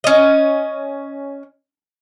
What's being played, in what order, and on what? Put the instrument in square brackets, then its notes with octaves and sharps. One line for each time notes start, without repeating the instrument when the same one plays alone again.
[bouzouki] C#4 D#5